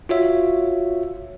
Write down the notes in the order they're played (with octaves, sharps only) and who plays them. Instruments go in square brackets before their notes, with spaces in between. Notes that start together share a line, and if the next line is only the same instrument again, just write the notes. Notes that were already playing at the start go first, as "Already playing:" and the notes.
[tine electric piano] F4 F#4 C#5 E5 F5